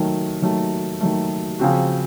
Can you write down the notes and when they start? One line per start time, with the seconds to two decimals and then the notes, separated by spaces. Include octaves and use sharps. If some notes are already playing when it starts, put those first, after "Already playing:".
Already playing: D#3 F#3 A3
0.42 D#3 F#3 A3
1.01 D#3 F#3 A3
1.60 C#3 F3 C4 F#4